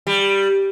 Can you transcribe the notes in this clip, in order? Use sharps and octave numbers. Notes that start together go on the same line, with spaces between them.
G3